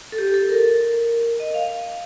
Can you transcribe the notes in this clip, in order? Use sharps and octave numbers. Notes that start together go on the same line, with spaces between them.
A4
G4
A4
A#4
D#5
F5